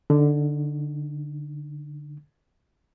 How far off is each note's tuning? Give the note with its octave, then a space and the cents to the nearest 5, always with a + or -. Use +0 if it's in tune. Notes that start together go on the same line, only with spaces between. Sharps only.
D3 +0 D#4 -25